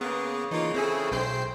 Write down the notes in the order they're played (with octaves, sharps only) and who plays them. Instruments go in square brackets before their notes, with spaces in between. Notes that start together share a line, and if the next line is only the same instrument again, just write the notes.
[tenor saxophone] C#3 [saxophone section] A#3 G#4 [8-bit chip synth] B3
[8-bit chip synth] E3 F4 [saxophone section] A#3 D#4
[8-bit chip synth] C4 G#4 [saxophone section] E4 A4
[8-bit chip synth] B1 G5 C7 [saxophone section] G#3 A3 C5